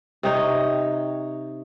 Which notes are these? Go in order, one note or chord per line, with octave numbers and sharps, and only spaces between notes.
C3 D#4 C#5